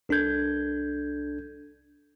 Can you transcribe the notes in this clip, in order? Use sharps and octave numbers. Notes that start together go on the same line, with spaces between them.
C2 D4 A4 G6 G#6